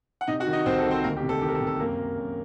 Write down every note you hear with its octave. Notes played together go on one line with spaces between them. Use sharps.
F#5
C3 D#4 D#5
F#4 F#5
D#3
D#4 D#5
C2 C4 C5
A4
D#3
C4 C5
D2 A#3 A#4
G4
C3
A4
D#3 G4
A#4
A4
C3
A4
F#2 A#3 A#4
F#2
F#2